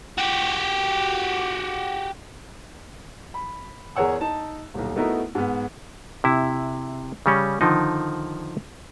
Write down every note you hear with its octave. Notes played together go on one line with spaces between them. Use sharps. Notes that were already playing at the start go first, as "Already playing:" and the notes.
F#4 G4
B5
E2 G#4 A#4 C#5 F#5 E6
D#4 A5
D#1 B1
A3 B3 D#4 E4 F#4 A#4
G#2 B3
C3 E4
C#3 G3 C#4
D3 D#3 F3 D#4